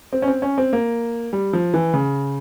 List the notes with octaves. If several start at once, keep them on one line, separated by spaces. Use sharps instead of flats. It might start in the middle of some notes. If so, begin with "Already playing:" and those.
C4
C#4
C4
C#4
C4
A#3
G3
F3
E3
C#3